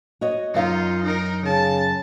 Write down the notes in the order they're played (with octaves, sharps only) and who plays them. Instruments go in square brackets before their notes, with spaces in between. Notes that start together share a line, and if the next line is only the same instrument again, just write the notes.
[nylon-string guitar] F#4 C#5 D#5
[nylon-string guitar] F#2 F5 [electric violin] D#4 F4
[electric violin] D#4 A#4
[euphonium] C#3 [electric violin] A5